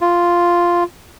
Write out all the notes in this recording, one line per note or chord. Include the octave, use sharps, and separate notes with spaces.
F4